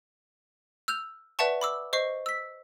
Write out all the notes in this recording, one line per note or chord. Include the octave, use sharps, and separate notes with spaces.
E6 F6 G6 F7
B4 D5 E5 F#5 A5 C#6
B5 D6 E6
C5 D#5 C#6 C7
E6 B6